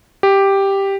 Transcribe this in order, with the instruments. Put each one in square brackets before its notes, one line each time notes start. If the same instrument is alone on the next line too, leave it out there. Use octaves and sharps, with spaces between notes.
[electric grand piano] G4